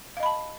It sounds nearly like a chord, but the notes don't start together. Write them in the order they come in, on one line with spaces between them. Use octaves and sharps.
F5 D#5 B5 A5